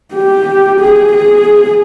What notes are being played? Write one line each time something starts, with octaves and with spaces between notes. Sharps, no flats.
G4
G#4
G#4